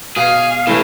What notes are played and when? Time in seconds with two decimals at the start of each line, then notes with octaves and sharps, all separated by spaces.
0.16 B2 G#4 F5
0.67 C3 E3 A3 C#4